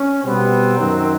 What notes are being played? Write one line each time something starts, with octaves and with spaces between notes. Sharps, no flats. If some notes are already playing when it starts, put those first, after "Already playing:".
Already playing: C#4
B2 G3 B3 C4
F#2 D#3 F#3